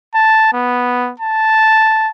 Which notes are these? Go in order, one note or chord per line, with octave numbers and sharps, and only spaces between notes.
A5
B3
A5